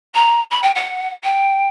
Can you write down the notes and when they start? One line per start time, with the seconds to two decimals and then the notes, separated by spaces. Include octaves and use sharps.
0.14 A#5
0.51 B5
0.62 G5
0.75 F#5
1.23 G5